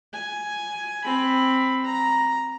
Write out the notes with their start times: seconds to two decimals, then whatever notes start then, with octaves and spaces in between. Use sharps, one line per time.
0.13 G#5
1.05 C4 B5
1.85 A#5